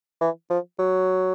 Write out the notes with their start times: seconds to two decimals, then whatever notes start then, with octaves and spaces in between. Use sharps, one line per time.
0.21 E3
0.50 F3
0.79 F#3